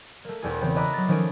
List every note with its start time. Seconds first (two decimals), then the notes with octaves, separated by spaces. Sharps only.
0.25 A3 A#3
0.43 E1 E2 G#4
0.61 C#3 E3 B3 C4
0.76 D#5 E5 A#5 B5 D6 F#6
0.94 F#3 A6
1.08 D#3 F3 A3 C#4 D#6 D7